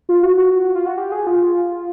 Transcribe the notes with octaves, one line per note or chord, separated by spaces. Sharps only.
F4
F#4
F#4
F4
F#4
G4
G#4
F4